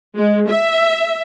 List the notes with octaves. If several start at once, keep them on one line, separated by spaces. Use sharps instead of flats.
G#3
E5